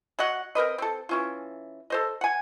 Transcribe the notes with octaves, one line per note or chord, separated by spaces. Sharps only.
F#3 D#5 F#5
C4 A#4 B4 D#5
C4 A4
E3 C#4 F4
A4 C5 D#5
F#5 G#5